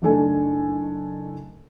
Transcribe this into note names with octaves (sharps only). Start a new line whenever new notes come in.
F#1 D#3 A3 D4 A4 G#5